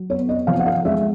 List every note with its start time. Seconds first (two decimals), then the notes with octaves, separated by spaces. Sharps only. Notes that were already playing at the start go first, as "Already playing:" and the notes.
Already playing: F#3
0.10 B3 C#5
0.29 D#5
0.47 F3 F5
0.59 F#5
0.66 F5
0.85 G#3 E5